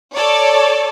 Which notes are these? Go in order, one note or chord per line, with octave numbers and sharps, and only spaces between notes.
A4 C#5 D5